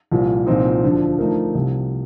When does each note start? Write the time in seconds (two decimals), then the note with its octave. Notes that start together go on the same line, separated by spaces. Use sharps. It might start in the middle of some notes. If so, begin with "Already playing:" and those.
0.12 C2 A#2 F3
0.47 C2 A#2 F3 C4 D#4
0.84 D2 D3 F3
1.19 D3 F3 A3 D#4 A#4
1.54 C2 C3 F3